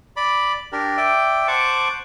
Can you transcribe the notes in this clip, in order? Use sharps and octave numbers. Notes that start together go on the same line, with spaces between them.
D5 B5
D4 G4 A#4
D5 E5 G5
C5 F#5 A5 C#6 D6